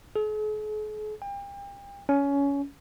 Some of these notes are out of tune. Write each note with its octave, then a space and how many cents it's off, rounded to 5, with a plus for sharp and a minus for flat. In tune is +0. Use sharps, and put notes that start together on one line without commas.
G#4 +45
G5 +35
C#4 +20